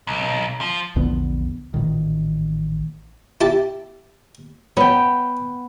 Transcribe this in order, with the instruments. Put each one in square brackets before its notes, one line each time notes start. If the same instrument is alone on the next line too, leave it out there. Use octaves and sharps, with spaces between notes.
[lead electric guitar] B1
F3
[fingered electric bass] A#1 E2 D3 B3
A1 A#2 D#3
[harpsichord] E4 G4 A5
[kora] B3 G5 [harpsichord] C#4